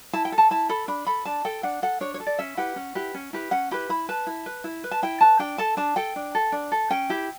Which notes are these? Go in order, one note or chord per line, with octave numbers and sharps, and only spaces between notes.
E4 A5
G5
A4
A5
E4 A5
A4 B5
D4 B5
A4 B5
D4 A5
A4 G5
D4 F#5
A4 F#5
D4 C#5
C#5
A4
D5
C#4 E5
E4 G4 B4 F#5
C#4
E4 G4 B4
C#4
E4 G4 B4
C#4 F#5
E4 G4 B4 B5
E4 B5
B4 A5
E4
B4
E4
B4
A5
E4 G5
B4 A5
D4 G5
A4 A5
D4 A5
A4 G5
D4
A4
D4
A4
C#4 G5
E4 G4